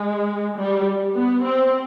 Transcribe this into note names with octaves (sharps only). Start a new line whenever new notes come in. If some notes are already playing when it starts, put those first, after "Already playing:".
Already playing: G#3
G3
B3
C4